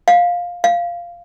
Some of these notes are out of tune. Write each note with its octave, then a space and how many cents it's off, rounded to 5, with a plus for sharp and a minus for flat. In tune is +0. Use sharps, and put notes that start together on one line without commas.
F5 +10
F5 -10